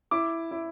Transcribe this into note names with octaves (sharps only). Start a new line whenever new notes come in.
E4 D6
E4